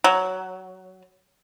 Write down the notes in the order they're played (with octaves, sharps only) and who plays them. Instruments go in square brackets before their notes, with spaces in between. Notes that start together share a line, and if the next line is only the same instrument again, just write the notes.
[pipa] F#3